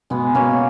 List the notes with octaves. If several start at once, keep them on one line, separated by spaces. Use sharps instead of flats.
B2 G#3 B3
B2 A#3 C#4